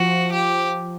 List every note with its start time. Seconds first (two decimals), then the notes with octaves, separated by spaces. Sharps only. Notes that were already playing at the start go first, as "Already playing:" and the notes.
Already playing: F3 F#4
0.32 G4